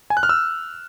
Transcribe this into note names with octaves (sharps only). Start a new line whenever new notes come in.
G#5
F#6
F6
E6